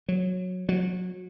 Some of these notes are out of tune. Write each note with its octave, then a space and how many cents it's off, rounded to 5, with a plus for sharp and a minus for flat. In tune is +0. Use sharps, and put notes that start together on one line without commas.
F#3 -15
F#3 -25